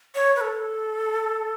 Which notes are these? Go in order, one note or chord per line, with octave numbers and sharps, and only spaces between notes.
C#5
B4
A4